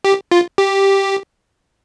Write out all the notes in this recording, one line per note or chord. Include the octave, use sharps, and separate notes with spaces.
G4
F4
G4